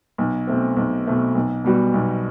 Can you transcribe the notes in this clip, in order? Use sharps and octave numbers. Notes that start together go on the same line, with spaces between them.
B1
B2 A3 C4
B1
B2 A3 C4
B1
B2 G3 B3 F#4
B1